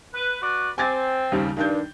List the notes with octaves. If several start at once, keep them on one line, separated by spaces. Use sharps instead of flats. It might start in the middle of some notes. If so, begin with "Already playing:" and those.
B4
F#4 B4 D5
C4 G#5 D6 A6
D#2 C#3 G3
G2 D#3 D4 G6